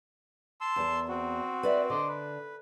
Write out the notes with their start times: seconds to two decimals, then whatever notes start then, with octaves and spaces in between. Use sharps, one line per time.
0.61 A5 C6 E6
0.76 E2 A#4
1.08 C4 F#4
1.63 B4 D5 E5
1.90 D3 C5 D5 D#5
2.08 B4